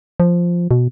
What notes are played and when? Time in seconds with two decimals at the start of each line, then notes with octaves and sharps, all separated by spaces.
0.20 F3
0.71 B2